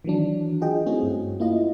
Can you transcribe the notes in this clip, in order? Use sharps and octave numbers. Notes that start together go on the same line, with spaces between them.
D#3 E3 F#3 D4
F4 F#4 G#4 D#5 G5
A3 C4 C#4 E4 F#4 G#4
G2
A#3 E4 F4 D#5